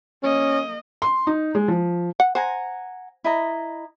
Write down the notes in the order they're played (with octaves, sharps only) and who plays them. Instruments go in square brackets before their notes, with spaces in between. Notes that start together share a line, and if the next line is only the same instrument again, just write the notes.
[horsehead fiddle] A#3 D#5 [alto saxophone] C#4
[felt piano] C6
D#4
G#3
F3
[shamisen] F#5
[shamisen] C5 [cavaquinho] F#5 G#5 A#5
[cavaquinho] E4 D#5 A#5